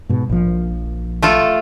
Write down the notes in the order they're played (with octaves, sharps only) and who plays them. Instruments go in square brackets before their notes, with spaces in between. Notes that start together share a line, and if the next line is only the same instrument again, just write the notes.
[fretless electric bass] G#2 B2
A#1 F3
[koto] A3 F4 A4